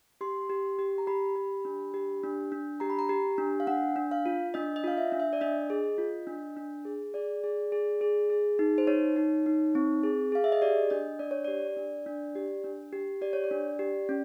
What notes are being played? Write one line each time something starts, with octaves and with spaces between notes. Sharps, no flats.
G4 C6
G4
G4
A#5
G4 B5
G4
D4
G4
D4
D4
G4 A#5
B5
A#5
G4
D4
F5
D4 F#5
D4
F5
F4
D4 D#5
D#5
F4 F5
E5
D4
E5
D5
D4 D#5
G#4
F4
D4
D4
G#4
G#4 D5
G#4
G#4
G#4
G#4
D#4
C5
D#4 C#5
D#4
D#4
C4
G#4
G#4 F5
E5
D#5
G4 D5
D4 D#5
D4 D5
C#5
G4 D5
D4
D4
G4
D4
G4
G4 D5
C#5
D5
D4
G4
C#4